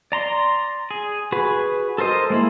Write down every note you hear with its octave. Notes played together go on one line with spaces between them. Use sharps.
D5 A#5 C6
G#4
F#4 G#4 B4
A4 A#4 C5 D#5
G#3 A#3 E4